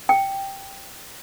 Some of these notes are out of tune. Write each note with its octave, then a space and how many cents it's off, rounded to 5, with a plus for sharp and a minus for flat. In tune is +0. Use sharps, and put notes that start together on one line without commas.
G5 +0